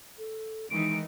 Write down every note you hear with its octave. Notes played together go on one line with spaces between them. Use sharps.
A4
D#3 E3 G#3 D#4 D7